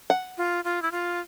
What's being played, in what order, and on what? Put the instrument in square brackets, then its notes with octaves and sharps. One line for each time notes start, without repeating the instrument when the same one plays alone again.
[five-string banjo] F#5
[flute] F4
F4
E4
F4